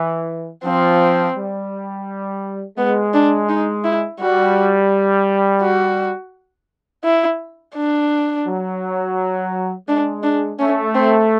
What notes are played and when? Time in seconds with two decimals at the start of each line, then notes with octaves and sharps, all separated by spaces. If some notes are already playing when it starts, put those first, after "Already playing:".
Already playing: E3
0.64 F3 C4
1.36 G3
2.78 G#3 B3
3.14 D4
3.49 D#4
3.84 E4
4.19 G3 F#4
5.62 F#4
7.04 E4
7.76 D4
8.46 F#3
9.88 G#3 D4
10.23 D4
10.59 A3 C#4
10.95 C4